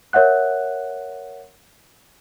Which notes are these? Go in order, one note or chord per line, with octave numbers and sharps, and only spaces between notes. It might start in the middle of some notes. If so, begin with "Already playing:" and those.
A#4 C#5 E5 F#5 F#6